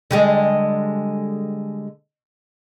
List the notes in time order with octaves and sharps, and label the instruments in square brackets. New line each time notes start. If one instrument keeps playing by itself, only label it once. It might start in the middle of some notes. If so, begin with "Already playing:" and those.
[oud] D3 G3 G#3